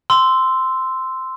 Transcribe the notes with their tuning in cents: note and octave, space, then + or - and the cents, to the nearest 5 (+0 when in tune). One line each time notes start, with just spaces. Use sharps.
C6 -10 E6 +0